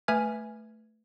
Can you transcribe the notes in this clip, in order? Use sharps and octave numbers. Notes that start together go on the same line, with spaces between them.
A3 B4 E5 G#5 F6 G#6